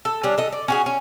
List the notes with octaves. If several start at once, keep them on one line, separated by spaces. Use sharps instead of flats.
A4
G3 C#4 D4
A4 D#5
D5
C#4 F#4 G#4
C#4